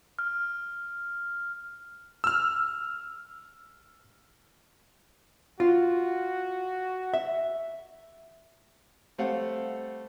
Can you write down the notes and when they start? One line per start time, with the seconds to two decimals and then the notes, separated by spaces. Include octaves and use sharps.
0.19 F6
2.24 E6 F6
5.60 F4 F#4
7.14 E5
9.18 G3 A3 C4 F5 F#5